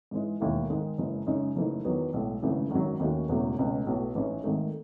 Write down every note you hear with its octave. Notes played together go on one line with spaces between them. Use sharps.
G#2 E3 G#3
E1 D#2 D#3 A3 E4
G#2 D#3 G#3
F#1 F#2 E3 G#3
F#2 C#3 G#3 D#4
F#1 F#2 E3 A3 D#4
E2 D#3 F#3 B3
B1 A2 G#3
G#1 F#2 C#3 E3 A3
G#1 F#2 D#3 F#3
D#2 D#3 A3 C#4 F#4
E1 E2 C#3 F#3 A3
C#2 B2 A3 C#4
B1 A2 F#3 B3
A1 G#2 E3 G#3 C#4
G#1 G#2 D#3 A3